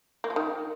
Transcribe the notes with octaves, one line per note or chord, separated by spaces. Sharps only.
A#3
F3
D#3